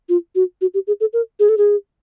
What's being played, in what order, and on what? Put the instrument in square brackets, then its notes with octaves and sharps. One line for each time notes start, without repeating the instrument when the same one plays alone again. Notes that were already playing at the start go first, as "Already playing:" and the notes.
[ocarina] F4
F#4
F#4
G4
G#4
A4
A#4
G#4
A4
G#4